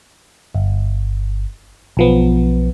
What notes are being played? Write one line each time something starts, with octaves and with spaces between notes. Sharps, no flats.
G1
B1 F3 B3